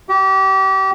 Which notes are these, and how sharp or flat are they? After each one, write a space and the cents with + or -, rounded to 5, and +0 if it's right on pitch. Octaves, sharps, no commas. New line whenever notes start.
G4 -30